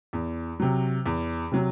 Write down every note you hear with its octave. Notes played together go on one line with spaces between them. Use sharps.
E2
C3 F#3
E2
C3 F#3